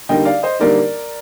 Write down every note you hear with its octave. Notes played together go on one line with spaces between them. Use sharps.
D3 G3 A#3 D#4 D#5 G5
D5 F5
C5 D#5
D3 G3 A#3 D#4 A#4 D5